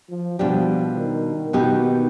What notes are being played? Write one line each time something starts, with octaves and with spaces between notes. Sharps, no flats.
F3
B2 F3 G3 D4 G4
D#3
B2 D#3 B3 D#4 G4